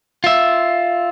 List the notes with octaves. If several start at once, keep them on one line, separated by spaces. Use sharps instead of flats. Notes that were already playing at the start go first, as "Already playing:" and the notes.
F4 E5